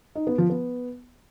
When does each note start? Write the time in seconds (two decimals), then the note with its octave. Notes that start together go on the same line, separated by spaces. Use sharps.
0.15 D#4
0.27 B3
0.38 F3
0.50 B3